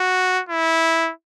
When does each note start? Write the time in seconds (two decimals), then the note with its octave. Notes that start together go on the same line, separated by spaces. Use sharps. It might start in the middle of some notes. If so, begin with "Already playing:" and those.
Already playing: F#4
0.49 E4